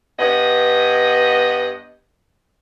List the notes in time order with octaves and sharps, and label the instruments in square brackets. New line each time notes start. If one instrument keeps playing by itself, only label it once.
[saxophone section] G2 B3 D#5